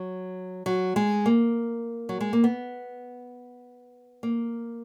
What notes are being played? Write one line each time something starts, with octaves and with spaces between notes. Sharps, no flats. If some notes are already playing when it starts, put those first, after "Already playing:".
Already playing: F#3
F#3
G#3
A#3
F#3
G#3
A#3
B3
A#3